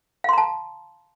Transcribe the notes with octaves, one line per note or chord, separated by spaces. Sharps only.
F5 A5 A#5 C6